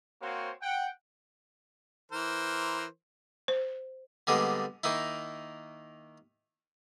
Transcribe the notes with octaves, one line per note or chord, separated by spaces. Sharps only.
A#3 C4 F#4 C5 C#5 C6
F#5 G5
E3 A#4 C5
C5
D3 G3 G#3 A#3 B3
D#3 A#3 D#4 E4